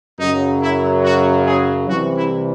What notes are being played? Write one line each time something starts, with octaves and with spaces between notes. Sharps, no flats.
F#2 C#3 F#3 D#4
E4
F#4
G#4
C2 C3 E3 F#4
E4